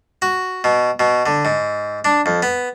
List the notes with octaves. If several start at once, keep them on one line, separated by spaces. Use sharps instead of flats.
F#4
B2
B2
D3
G#2
D4
F2
B3